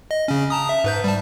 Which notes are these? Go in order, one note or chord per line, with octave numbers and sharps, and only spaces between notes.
D#5
C#3 C#4
A5 A#5 D#6
E5
G#2 B4 G6
G3 A5